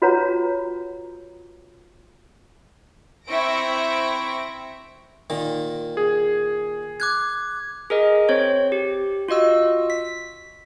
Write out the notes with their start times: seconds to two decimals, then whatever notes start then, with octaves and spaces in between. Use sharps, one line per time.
0.02 F4 F#4 B4 C#5 F#5 A#5
3.27 C4 E4 E5 C#6 A#6 D7
5.30 A#2 D#3
5.97 G#4
7.00 D6 F#6 G#6
7.90 G#4 A#4 D#5
8.29 C4 C5 C#5
8.72 G4
9.28 F4 F#4 D#5 E6
9.90 B6